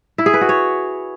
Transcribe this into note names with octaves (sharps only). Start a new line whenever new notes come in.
E4
G#4
B4
F#4
C#5